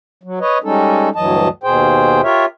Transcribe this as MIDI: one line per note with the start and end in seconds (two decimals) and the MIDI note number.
0.23 0.39 54
0.40 0.58 71
0.40 0.58 73
0.40 0.58 75
0.63 1.09 55
0.63 1.09 56
0.63 1.09 61
0.63 1.09 63
0.63 1.09 69
1.16 1.48 38
1.16 1.48 43
1.16 1.48 52
1.16 1.48 54
1.16 1.48 75
1.16 1.48 81
1.63 2.21 39
1.63 2.21 47
1.63 2.21 68
1.63 2.21 72
1.63 2.21 79
2.23 2.45 65
2.23 2.45 67
2.23 2.45 70
2.23 2.45 73
2.23 2.45 76